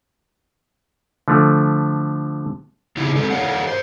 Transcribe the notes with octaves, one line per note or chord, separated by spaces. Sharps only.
D3 F3 A3
C#3 D#4 E4 G4
G#3 C4 A4
G4 A#4 C#5 F5 F#5
G#2 C5